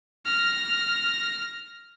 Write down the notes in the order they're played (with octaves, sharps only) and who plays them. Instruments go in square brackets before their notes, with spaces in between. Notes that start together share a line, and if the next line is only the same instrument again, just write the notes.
[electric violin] F6 A#6